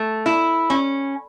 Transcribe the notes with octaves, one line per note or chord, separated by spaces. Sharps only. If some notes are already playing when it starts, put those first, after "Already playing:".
Already playing: A3
E4
C#4